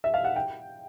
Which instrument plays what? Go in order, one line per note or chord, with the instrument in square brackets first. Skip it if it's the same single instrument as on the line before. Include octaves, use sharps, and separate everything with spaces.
[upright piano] E5
F5
F#5
G5